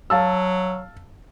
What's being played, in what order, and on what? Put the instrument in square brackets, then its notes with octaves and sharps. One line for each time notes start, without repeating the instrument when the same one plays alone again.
[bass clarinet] F#3 [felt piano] F5 A5 E6